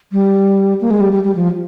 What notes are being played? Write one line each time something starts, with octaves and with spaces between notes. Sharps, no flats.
G3
A#3
G#3
G3
G3
G3
F3